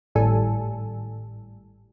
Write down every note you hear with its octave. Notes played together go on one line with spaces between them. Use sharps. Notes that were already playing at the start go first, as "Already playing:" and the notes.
G#1 A2 G3 A4 G#5